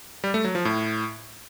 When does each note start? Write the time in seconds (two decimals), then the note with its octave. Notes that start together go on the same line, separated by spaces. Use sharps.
0.24 G3
0.34 A3
0.44 F#3
0.55 F3
0.65 A2